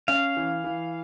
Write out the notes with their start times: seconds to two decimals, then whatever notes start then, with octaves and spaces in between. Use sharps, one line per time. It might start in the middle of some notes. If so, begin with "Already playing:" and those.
0.08 C#4 F5
0.37 E3
0.64 E3